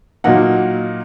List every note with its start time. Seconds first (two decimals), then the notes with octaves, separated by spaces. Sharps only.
0.24 A#2 F#3 A#3 D#4 F#5